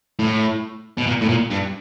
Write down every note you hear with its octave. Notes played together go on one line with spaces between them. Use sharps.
A2
B2
A#2
A2
A#2
G2